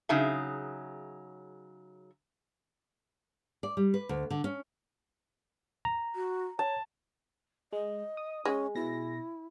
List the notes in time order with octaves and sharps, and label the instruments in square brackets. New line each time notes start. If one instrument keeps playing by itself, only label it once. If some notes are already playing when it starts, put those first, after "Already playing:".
[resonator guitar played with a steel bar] C#3 F#3 D#4 G#4 E5
[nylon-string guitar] D5
G3
B4
D2
D3
C#4
[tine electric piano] A#5
[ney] F#4
[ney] C#5 [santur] A5
[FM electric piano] G#3 [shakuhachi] D#5
[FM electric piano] D#6
[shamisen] G#3 [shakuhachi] C#4
[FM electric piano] B2 A#6 [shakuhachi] E4